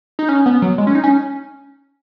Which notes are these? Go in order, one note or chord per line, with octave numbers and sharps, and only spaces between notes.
D#4
C#4
B3
F#3
G#3
C#4
D#4
C#4